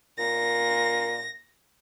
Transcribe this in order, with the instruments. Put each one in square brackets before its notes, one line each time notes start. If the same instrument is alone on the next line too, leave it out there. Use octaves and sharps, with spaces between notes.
[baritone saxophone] A#2 [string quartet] A#6